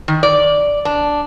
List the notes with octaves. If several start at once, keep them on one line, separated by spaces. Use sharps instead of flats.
D#3
D5
D4